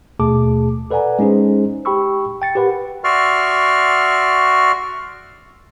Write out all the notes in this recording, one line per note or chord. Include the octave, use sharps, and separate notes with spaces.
D#2 B2 A3 G#4 A5 D6
A4 B4 D5 F#5 G#5 A#5
G#3 C#4 D#4 G#4 C5
G4 G5 B5 C#6 E6
G5 A6 C#7
G4 A#4 B4 F#5 B5
F#4 D5 E5 C6 C#6 F6